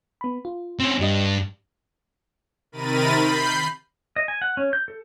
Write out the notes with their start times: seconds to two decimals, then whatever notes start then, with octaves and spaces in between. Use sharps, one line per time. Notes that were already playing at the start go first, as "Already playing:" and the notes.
0.21 B3 B5
0.45 F4
0.80 C4 C#4
1.00 G2 D4 G4 D#5
2.72 C3 D#3 A#4 B5 A6 D#7
3.18 B5 G6 C7
4.16 D#5
4.28 G#5
4.42 F#5
4.57 C#4
4.73 G6
4.88 A4